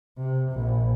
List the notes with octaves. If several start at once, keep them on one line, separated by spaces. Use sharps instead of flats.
C3
A#1